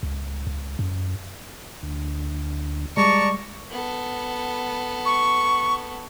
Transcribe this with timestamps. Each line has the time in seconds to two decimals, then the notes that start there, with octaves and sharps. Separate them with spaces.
0.03 C#2
0.47 C#2
0.79 F#2
1.83 D2
2.97 G3 G#3 D5 A5 A#5 C#6
3.71 B3 A4
5.05 C#6